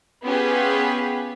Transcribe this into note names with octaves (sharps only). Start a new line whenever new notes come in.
B3 C#4 F4 G4 G#4 B4